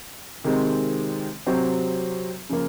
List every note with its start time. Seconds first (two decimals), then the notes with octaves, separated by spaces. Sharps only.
0.44 C3 D#3 G#3 C4
1.46 C3 F#3 C4 F#4 C5
2.50 C#3 F3 A#3